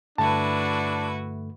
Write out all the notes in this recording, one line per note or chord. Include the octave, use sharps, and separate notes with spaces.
G2 D3 A3 D4 E4 F#4 B4 A5